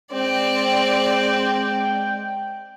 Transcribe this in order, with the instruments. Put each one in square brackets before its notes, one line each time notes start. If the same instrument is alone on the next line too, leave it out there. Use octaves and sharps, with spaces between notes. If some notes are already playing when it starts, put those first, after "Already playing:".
[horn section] G#3 G5 [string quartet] C4 D5